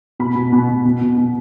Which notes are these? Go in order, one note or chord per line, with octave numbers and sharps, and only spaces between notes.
B2 B5
B2
B2
B2
B2
B2
B2